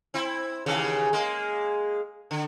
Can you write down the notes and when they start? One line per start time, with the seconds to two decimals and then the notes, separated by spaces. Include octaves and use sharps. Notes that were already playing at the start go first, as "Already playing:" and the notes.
0.14 C4 E4
0.66 D#2 C#3 E3
1.13 G#3 A#3
2.31 D3